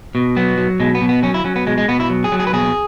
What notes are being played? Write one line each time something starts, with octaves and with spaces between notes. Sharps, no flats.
B2
F#3 B3
F#3
B2 G#3
B3
B2
B3
F#3 C#4
E4
F#3 C#4
B3
B2 G#3
G#3
B2 B3
E4
F#3
G#4
F#3
G#4
B4
B2 G#4